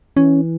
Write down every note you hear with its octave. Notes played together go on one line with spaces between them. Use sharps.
E3 C#4